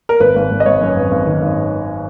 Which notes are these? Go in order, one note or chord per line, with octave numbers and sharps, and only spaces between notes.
A#4
G#1 B4
G#1
G#1
D#5
G#1 C#5
F#2
G#1
G#1
D#3
G#1